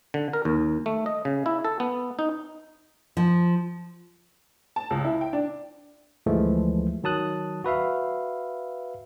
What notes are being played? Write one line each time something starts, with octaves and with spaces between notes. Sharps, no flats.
D3
A#4
D#2
A3
D#5
C#3
E4
A4
B3
D#4
F3
A5
C#2
E4
G5
D4
D2 E3 F3 G#3 A3
D#3 F#3 A5 D#6 F#6
F#4 B4 E5 F5